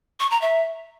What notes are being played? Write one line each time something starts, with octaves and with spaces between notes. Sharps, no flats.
C#6
A#5
E5